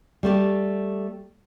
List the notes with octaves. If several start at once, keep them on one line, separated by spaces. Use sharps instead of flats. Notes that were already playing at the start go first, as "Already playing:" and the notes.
G3 A3 G4